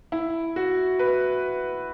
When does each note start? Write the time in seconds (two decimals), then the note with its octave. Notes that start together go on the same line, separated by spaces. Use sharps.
0.12 E4
0.56 F#4
0.99 B4